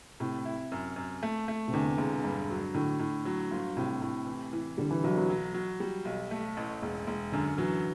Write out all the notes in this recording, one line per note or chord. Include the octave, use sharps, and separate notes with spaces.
A2 C3
E4
F#2
F#2
A3
A3
C3
E2 D3
E1
G2
F#3
A2 D3
A2
F#3
G1
A2 C3
A2
E3
E3
D3 G3
E3
B1 F#3
F#3
F#3
F#3
G3
B1
A3
A1
E1
E1
F#2 D3
E3 F#3